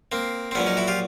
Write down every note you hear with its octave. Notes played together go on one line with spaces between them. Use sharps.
A#3 C4
C4
A#1 A#2 F#3 B3 C#4
C#4 D#4
E4 F#4
F4 G4